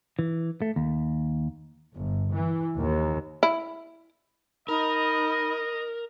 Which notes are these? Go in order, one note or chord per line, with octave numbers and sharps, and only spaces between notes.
E3
A3
D#2
G1
E3
D#2
E4
D#4 A#4 D#5 B5